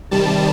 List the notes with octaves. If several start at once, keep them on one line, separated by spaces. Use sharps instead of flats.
C3 D#3 G3 A5